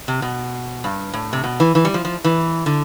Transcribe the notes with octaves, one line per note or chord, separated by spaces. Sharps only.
C3
B2
G2
A2
C3
B2
E3
E3
G3
F3
F3
E3
D3